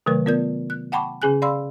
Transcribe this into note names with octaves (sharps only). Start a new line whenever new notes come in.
C3 D#3 F#3 A3 A#4 B4
B3 F4 A#4 D5 G6
F#6
F#5 G5 A5 B5 C#6 D6
C#3 C#4 G#4 G#5 F#6
D5 F5 B5 C6 E6